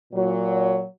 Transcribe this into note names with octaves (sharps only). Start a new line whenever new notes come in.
A#2 F#3